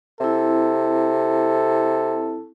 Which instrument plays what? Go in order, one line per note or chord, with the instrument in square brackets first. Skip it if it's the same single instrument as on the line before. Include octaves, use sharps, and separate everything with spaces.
[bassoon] C3 [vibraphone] C4 E4 [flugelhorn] A4